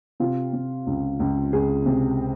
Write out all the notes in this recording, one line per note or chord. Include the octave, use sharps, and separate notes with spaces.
C3 F4
C3
C#2
C#2
C#2 G#4
C3